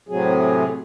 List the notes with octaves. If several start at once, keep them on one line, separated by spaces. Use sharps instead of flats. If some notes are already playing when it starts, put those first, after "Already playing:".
A2 C3 F#3 G#4